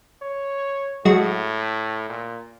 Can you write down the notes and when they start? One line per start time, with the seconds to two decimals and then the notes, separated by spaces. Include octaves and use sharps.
0.22 C#5
1.05 A2 F#3 G#3 F#4
2.09 A#2